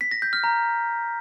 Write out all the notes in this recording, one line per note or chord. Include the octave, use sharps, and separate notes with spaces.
B6
A#6
G6
F6
A#5